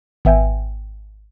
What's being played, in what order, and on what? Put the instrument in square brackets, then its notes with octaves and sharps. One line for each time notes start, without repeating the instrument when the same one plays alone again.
[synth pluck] G#1 B3 E5 G5 G#5